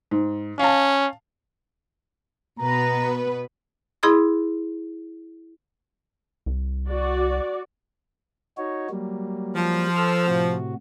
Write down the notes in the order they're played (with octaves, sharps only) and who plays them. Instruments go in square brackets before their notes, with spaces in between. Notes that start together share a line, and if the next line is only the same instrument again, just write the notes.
[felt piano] G#2
[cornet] C#4 [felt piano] F5 A5
[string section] B2 B3 B4 [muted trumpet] A#5
[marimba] E4 G#4 B5 C6 D#6
[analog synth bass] C2
[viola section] F#4 D5
[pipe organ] D#4 F#4 C#5
F#3 G3 A#3
[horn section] F3
[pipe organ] A4 E6 F6
A2 C3 F#4